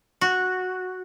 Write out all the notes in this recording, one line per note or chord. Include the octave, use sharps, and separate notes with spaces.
F#4